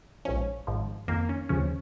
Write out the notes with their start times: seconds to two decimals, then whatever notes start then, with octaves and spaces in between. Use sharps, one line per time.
0.25 A#1 G#2 F3 C#4
0.67 G#1 G#2 F3
1.08 F2 D#3 A#3
1.29 C#4
1.49 D#2 C#3 F3 C#4